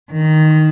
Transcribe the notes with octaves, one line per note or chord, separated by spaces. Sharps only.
D#3